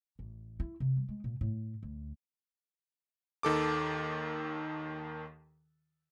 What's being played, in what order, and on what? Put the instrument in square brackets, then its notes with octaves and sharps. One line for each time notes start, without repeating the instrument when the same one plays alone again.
[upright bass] A1
E4
C3
G3
G#3
A#2
A2
D2
[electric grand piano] D#2 D#3 A4 D6